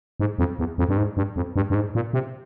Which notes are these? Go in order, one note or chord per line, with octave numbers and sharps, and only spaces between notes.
G#2
F2
E2
F2
G2
G#2
G2
F2
G2
G2
G#2
A#2
C3